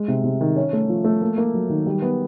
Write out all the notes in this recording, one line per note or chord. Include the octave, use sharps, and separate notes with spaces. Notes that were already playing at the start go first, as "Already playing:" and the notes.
Already playing: G#3
C3
C3
D#3
C#4
A3
F3
A3
A#3
A#3
F#3
D#3
G3
B3